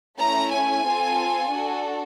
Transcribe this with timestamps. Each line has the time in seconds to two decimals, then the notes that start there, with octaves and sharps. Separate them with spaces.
0.19 A3 C#4 E4 A#5
0.52 G#5
0.84 C4 F4 A4
1.51 D4 F#4 A4